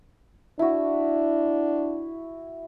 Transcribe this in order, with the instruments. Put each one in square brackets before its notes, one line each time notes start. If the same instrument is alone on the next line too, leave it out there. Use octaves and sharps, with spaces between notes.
[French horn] D4 [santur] E4 F#4